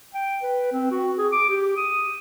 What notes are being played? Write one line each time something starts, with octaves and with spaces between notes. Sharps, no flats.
G5
B4
C4
F#4
G#4
D6
G4
D#6